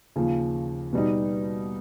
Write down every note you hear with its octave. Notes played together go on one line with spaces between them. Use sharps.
D#2 C#3 F3
B2 G3 B3 D#4